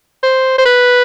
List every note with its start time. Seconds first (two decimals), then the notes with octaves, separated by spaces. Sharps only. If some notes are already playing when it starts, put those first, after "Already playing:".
0.23 C5
0.58 C5
0.66 B4